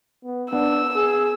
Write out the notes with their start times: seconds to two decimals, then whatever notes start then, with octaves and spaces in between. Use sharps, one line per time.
0.24 B3
0.53 B3 D4 E6
0.96 G#4